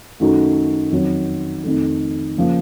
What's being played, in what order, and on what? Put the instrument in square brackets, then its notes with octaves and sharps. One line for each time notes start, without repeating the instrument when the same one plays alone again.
[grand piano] F#2 D#3 A3 D#4 F#4
F2 D#3 F#3
F2 D#3 A3
C#3 F3 A#3